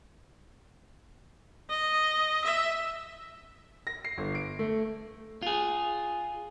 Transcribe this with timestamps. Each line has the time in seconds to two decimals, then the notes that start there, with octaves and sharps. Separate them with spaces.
1.70 D#5
2.45 E5
3.87 A#6
4.05 C7
4.18 G1
4.35 D7
4.59 A3
5.42 F4 G#4